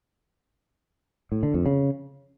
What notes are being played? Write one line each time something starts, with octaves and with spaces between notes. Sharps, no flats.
A2
D3
F2
C#3